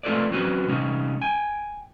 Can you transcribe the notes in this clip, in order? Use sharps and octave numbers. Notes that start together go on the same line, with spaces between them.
A3 C4 F4 A4 B4 D5
F#3 C4 C#4 F#4 B4
C3 G3 C#4 D#4
G5 G#5